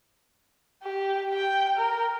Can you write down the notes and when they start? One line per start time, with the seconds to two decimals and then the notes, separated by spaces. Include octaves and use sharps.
0.83 G4
1.33 G5
1.77 A#4